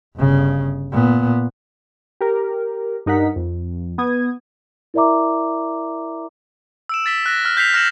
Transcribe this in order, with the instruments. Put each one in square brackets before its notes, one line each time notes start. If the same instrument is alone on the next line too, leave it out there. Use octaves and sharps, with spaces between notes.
[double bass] G1 C#3
A#2 B3
[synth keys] G4 A#4
G2 D#4 A#4 F#5 B6
F2
B3 D#6 G#6
[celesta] E4 A#4 D5 E5 A#5 D6
[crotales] E6 D7 E7
A6 B6 G7
F#6 A#6 E7
F6
G6 B6 C7 F7
F6 A#6 B6 C#7 E7 F#7